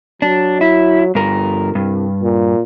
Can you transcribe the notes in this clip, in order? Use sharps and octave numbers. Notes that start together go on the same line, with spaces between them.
F#3 D4
E4
G1 G2 A#4
C2 G2
A#2